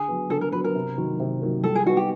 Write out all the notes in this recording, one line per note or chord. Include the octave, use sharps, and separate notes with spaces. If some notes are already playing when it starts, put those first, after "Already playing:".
Already playing: D3 G#4
F#3 B3
D3 A4
A#4
F#3 B3 B4
A#4
C3
D#3 F#3 A#3
C3
D#3 F#3 A#3
G3 A4
G#4
B3 D#4 F#4
G4